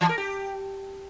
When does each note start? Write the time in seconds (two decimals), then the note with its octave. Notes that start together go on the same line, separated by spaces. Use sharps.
0.01 E3
0.09 A#4
0.18 G4